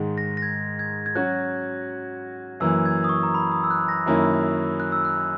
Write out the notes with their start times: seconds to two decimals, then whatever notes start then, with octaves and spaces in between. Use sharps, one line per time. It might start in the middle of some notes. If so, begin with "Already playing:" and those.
Already playing: G#2 D#3 G#3
0.18 A#6
0.37 A#6
0.42 G#6
0.79 G#6
1.06 G#6
1.15 F#3 C#4 F#4 F#6
2.60 F#2 E3 A#3 E6
2.85 G#6
3.04 D#6
3.09 C#6
3.23 A#5
3.35 B5
3.52 D#6
3.64 E6
3.71 F#6
3.89 A#6
4.06 F#2 D#3 A#3 C#4 E4
4.80 F#6
4.92 E6
5.05 F#6